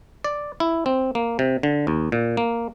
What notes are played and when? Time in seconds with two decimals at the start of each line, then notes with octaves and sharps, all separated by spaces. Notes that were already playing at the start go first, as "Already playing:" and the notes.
0.24 D5
0.60 E4
0.86 C4
1.15 A#3
1.39 C3
1.63 D3
1.87 D#2
2.12 A#2
2.37 A#3